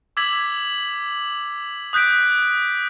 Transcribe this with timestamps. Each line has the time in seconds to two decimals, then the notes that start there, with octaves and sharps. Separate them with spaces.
0.17 D6 E6 G#6 B6 F#7
1.93 D#6 F#6 G6 B6 D7